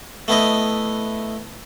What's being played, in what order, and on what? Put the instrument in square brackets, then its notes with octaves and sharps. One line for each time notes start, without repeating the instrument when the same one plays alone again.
[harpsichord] A3 B3 E4 D#5